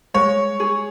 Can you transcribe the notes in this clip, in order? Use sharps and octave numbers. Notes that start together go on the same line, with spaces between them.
G#3 C#5
G#4